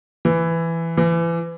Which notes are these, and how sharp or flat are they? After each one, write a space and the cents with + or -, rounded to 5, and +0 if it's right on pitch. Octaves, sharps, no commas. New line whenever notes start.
E3 +10
E3 +30